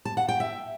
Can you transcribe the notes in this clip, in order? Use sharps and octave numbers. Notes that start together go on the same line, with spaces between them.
A5
F#5
G5
E5